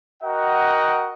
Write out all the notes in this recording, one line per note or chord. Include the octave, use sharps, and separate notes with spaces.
F#4 A#4 D#5 F#5 G5